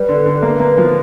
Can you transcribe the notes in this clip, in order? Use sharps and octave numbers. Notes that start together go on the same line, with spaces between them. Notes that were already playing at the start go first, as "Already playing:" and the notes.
Already playing: G3 B4
D3
D3
A#3
A#3
F3